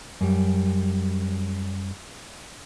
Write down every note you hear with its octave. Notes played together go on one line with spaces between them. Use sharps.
F#2 G3